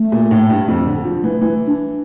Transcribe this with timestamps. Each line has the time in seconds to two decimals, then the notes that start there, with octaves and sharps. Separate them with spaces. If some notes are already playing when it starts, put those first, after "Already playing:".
Already playing: A3
0.12 A#2
0.31 A2
0.50 G2
0.68 F2
0.87 D3
1.05 F3
1.24 E3
1.41 E3
1.67 D4